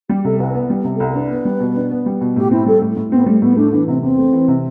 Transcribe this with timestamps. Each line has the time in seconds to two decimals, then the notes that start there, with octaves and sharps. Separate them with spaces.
0.09 G3 G4
0.25 C3 A4
0.39 C2 B4
0.54 B3 B4
0.70 G3
0.84 C3
0.95 C2 A4
1.09 A4
1.15 D4 B4
1.30 B3
1.45 G3
1.60 B2
1.76 D4
1.91 B3
2.06 G3
2.21 B2
2.36 A2 G4
2.51 C4 E4
2.66 G3 A4
2.81 A2
2.97 A2
3.12 B3 C4
3.26 G3 A3
3.42 A2 B3
3.57 A3 D4
3.72 E3 D4
3.88 C3 C4
4.02 E2 C4
4.18 A3
4.33 E3
4.48 C3